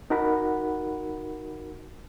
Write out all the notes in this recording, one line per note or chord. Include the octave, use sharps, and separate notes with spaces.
D#4 F#4 A#4 F#5 B5